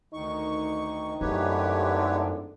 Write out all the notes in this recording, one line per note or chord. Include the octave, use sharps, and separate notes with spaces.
D2 D#3 D#4 C#6
G#1 F#2 A2 D3 G4 B4 C#5